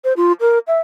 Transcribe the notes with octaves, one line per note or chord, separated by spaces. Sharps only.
C5
F4
A#4
E5